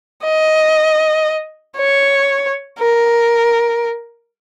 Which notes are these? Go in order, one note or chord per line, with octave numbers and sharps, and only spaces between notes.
D#5
C#5
A#4